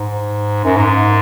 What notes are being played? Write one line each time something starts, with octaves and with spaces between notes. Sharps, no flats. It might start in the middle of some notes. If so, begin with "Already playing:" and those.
Already playing: G#2
F#2
G#2